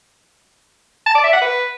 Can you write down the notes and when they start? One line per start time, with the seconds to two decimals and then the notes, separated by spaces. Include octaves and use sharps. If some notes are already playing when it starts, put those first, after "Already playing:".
1.06 A5
1.15 D5
1.24 E5
1.33 F#5
1.42 B4